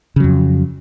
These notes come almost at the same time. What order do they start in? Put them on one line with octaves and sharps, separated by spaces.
C#3 F#3 F2